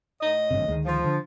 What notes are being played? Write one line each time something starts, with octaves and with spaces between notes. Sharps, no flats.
A2 D#5
G#1 G2 C3
D2 D#3 G#3
F3
D3